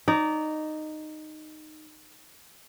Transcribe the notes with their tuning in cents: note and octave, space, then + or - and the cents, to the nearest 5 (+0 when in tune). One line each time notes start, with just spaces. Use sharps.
D#4 -10 D5 -25